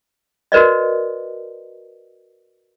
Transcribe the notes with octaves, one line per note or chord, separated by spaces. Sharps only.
F#4 A#4 B4 D5 D#5